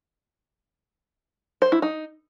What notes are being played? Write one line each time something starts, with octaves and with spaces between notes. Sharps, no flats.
C5
E4
D#4